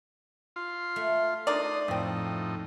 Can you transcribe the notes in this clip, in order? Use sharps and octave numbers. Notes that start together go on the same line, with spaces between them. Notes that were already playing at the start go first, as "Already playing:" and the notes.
F4 C6
A3
D4 D#4 A#4 D5 C6 D#6
F2 A2 F3 C4 D#4